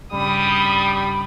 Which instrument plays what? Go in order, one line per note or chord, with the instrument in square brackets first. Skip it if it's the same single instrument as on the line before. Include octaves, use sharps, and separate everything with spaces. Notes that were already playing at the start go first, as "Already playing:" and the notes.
[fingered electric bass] G2 C#3 [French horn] G3 [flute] B5 [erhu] D#6